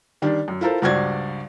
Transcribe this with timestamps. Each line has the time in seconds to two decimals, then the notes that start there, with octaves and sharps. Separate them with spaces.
0.22 D#3 G3 D4
0.48 F#2
0.61 E4 F4 A4 A#4 C5
0.82 C#2 G2 F#4 C5 D5 G#6